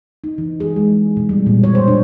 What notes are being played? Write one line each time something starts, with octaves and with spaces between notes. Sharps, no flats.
D#4
E3
G#4
G#3
B2
G3
A#2
C#5
C5
D4